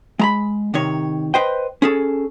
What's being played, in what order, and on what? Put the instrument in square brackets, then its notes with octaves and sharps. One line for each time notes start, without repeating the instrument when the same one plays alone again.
[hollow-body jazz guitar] G#3 A#5 B5
C3 D#3 C#5
B4 C5 D#5 G5
C#4 G#4 A4